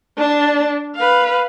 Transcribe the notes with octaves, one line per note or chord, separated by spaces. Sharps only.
D4 A5
B4 F5